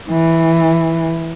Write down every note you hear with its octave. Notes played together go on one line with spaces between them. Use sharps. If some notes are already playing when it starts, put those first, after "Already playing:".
E3